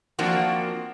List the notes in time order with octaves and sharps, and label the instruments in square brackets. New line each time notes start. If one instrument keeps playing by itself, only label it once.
[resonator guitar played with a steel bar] F3 A#3 C4 D4 F#4